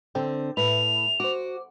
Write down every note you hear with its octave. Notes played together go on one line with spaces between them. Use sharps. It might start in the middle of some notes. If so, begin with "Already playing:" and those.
D3 C4 G5
A2 B4 E5 B5 F7
F#4 C5 D6